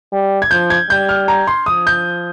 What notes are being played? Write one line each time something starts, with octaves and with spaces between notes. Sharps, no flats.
G3
G#6
F3 G6
G#6
G3 G6
F6
A#5
C6
F3 D#6
G6